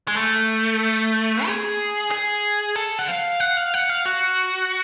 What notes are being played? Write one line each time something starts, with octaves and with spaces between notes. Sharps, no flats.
G#3
A3
G#4
G#4
A4
F#5
F5
F#5
F5
F#5
F5
F#4